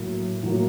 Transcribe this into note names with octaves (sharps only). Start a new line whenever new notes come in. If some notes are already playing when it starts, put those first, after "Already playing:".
Already playing: A2 F#3 A#3
A2 F#3 A#3